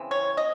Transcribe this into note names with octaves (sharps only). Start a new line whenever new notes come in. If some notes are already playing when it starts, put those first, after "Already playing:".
Already playing: C#3 E3 C4
C#5
D#5